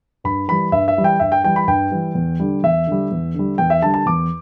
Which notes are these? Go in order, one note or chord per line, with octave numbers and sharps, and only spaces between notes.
G2 B5
E3 G3 B5
G2 E5
E5
E3 G3
G5
G2 E5
G5
E3 G3 G5
B5
G2 G5
E3 G3
E2
D3 G3
E2 E5
D3 G3
E2
D3 G3
E2 G5
E5
D3 G3 A5
A5
E2 D6